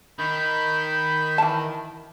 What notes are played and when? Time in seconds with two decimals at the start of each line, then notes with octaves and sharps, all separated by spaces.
0.19 D#3 B5 G6
1.38 E3 A5